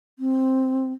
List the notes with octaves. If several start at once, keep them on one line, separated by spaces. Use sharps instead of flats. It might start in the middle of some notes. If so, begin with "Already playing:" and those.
C4